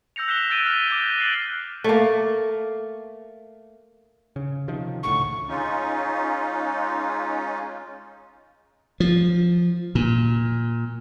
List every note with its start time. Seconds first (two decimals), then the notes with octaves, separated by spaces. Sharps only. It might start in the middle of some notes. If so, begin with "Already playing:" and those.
0.16 E6 G6 A#6 C#7 F7
0.28 F#6 G6 B6 E7 F7 G7
0.50 E6 G6 A6 D7 D#7 G7
0.66 E6 F6 B6
0.88 D6 G6 D7 D#7
1.18 F#6 A6 C7 D7 F#7
1.84 A3 A#3
4.36 C#3
4.68 C3 D#3 F3
5.03 C#2 A2 D3 C#6
5.48 G#3 C#4 D#4 F4
9.00 F3
9.95 A#2